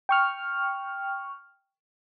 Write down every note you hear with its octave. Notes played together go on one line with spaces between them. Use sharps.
G5 C#6 F6